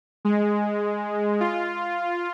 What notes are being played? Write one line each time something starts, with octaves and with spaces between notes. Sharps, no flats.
G#3
F4